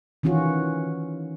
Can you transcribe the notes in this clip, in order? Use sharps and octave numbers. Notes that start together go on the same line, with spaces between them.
D#3 E3 C#4 F4 F#4